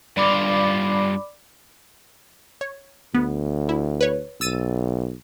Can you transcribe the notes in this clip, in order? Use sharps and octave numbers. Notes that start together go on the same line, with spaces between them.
G2 F4 D5 B5 D6
C#5
D2 B3
E4
B4 C#5
B1 E6 A6 D#7